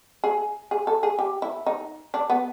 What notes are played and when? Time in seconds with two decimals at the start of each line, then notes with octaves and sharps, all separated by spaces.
0.24 G#4
0.71 G#4
0.87 A4
1.03 G#4
1.19 G4
1.42 E4
1.66 D#4
2.14 D4
2.30 B3